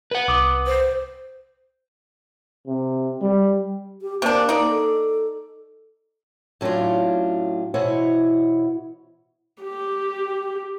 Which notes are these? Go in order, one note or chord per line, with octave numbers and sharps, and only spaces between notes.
B4 F#5
C2 D6 D#6
C5
C3
G3
G4
C3 A#3 D4
D#4 D5
A4
A2 F#3 C#4 D4 F4
B2 E3 E4 C5 C#5 F#5
G4